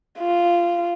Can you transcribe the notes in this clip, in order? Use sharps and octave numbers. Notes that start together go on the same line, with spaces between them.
F4